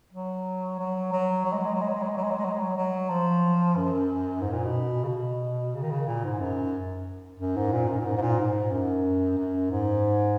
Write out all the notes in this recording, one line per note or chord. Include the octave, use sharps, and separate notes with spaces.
F#3
F#3
F#3
F#3
G#3
F#3
G#3
F#3
G#3
F#3
G#3
F#3
G#3
F#3
G#3
F#3
G#3
F#3
G#3
F#3
F#3
F3
F#2
G#2
A#2
B2
C#3
B2
C#3
D#3
C#3
A#2
G#2
F#2
F#2
G#2
A#2
F#2
A#2
G#2
G#2
A#2
G#2
F#2
F#2
G#2